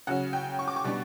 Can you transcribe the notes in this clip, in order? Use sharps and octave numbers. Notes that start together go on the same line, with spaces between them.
C#3 F#3 C#4 F#5
G5
C#6
D6
C#6
B2 G3 B3 D4